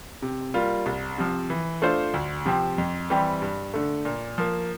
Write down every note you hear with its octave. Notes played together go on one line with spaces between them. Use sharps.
C3
G3 A#3 F4
C2
C3 F3
E3
A3 D4 F4 C5
D2
C3 F3 C4 G4
F2
E3 G3 C4 G4
G2
D3 A3
A#2
F3 A#3